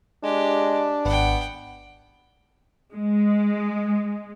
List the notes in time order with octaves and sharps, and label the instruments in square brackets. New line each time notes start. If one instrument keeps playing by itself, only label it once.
[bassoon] G#3 [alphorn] D4 [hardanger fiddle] G4
[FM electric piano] G#1 [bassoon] B3 [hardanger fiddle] F#5 G5
[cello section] G#3